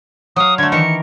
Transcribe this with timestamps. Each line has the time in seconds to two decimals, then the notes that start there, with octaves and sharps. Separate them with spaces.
0.36 F#3 F5 D#6
0.58 D3 A3 G#6
0.72 D#3 E3 A#4 C#7